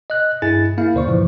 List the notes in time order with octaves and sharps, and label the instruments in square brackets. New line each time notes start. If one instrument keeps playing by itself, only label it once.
[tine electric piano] D#5 F#6
G2 E4 G#4 G#5 A6
A#3 E4 F5
D#2 C#3 C5 D5 C#6
G2 A#2 E3 F3